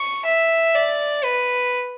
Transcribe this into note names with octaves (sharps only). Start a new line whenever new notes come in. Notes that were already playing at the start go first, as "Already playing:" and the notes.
Already playing: C#6
E5
D5
B4